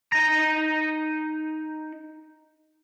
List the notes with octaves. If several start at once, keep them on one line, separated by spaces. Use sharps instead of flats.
D#4 A#5